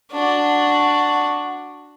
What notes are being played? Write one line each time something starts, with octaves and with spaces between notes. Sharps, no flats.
D4 F#4